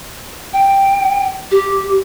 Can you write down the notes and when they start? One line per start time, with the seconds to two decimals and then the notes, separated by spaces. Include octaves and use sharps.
0.53 G5
1.51 G4